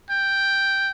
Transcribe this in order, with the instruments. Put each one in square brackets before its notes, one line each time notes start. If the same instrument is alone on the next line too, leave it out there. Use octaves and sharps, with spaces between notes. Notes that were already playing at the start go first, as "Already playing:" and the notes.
[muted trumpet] G5